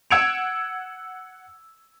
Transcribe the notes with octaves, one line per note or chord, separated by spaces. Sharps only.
F#5 E6 G#6 C#7 D7 F7